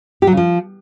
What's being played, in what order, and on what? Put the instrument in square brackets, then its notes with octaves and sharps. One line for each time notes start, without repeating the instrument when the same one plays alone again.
[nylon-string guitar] G4
F#3
C#3
F3